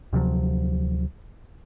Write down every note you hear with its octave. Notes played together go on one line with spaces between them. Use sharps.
D2 C3 F3 F#3